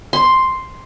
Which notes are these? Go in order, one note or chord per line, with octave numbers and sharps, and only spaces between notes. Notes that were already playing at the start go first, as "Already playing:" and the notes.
C6